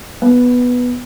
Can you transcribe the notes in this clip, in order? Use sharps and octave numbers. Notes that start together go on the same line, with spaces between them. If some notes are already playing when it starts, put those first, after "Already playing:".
B3